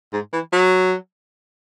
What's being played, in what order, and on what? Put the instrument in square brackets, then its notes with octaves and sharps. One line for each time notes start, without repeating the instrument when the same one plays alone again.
[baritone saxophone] G#2
E3
F#3